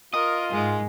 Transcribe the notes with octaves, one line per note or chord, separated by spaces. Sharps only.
F4 A#4 D#5
G#2 G#3